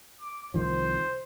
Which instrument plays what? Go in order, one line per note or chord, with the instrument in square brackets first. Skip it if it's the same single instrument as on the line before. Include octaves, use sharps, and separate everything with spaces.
[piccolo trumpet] D6
[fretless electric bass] C2 D#3 F3 [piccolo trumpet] C5